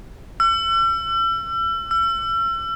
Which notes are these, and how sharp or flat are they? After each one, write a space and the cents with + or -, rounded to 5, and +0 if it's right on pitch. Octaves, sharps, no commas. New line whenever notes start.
E6 +40
E6 +40